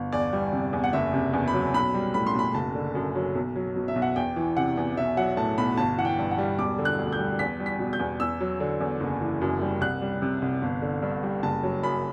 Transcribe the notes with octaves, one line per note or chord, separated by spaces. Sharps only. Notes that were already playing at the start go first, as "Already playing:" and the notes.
Already playing: G1
E2 D5
G3
C3
E2
F#5
F#1 E5
C3
E2
B5
F#3
B1 B5
G3
A2 B5
C6
B1 B5
F#1 A5
D3
F#2
F#3
B1
F#3
B2
E5
B1
F#5
E2 G5
E3
C3 F#5
E2
B1 E5
F#3 F#5
A2 A5
B1 B5
G1 A5
E3 F#5
G5
G2
F#5
G3
E1 D6
D3
F#6
D2
G6
G3
E2 B6
G3
B6
B2
G6
E2
E2 E6
F#3
D3
E2
F#1
E3
F#2
G3
C2 F#6
G3
C3
C2
G1
D3
G2
G3
F#1 A5
F#3
F#2 B5